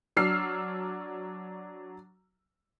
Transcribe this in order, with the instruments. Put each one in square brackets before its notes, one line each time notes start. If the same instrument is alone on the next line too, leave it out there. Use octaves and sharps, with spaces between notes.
[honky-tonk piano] F#3 D4 E6 F6 C7